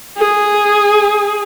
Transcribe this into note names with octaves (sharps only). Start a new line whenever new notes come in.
G#4